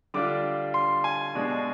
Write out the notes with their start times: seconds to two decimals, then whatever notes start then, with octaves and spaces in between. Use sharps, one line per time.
0.14 D3 G3 D4 F4 D6
0.74 C6
1.04 G#5
1.35 B2 G#3 D4